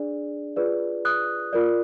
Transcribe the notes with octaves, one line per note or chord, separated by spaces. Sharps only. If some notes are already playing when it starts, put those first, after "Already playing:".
Already playing: D4 G#4 D5
F4 G#4 B4 D5
D#6 F#6
F4 A#4 D5